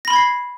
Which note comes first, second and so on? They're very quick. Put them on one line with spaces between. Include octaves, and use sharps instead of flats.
A#6 B5 C6 G#6 C7